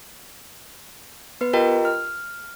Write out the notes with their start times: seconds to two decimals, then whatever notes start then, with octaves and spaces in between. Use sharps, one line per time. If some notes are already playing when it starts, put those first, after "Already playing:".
1.41 B3 B4
1.53 F4 G4 A#4 D#5 G5 A#5
1.85 F6